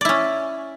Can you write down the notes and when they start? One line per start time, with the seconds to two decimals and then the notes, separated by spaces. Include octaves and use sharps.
0.01 D5
0.05 E4
0.09 C#4